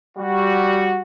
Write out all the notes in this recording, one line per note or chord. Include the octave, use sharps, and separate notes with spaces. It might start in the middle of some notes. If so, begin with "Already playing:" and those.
G3 F#4